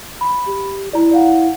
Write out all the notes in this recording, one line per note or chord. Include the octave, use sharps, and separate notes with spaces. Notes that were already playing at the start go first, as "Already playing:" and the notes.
B5
G4
E4 D5 A#5
D5 F5 F#5